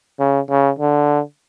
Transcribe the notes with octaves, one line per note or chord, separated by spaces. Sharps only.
C#3
C#3
D3